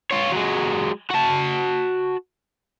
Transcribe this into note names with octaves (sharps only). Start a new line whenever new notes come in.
F4 C#5
F#3 G#3
F#4 A5